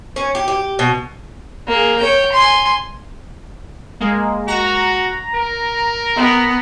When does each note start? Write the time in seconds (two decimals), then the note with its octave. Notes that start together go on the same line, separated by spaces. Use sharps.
0.16 C#4
0.35 G4
0.48 G4
0.79 B2
1.68 A#3 G#4
1.99 C#5 G5
2.32 G#5 C6
4.00 G#3 A#3
4.48 F#4 A#5
5.35 A#4
6.16 B3